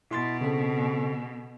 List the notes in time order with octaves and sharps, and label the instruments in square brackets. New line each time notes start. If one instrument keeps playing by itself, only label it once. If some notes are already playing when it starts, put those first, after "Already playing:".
[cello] B2 [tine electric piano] E4 C6 A6
[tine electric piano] C#3 C4 A4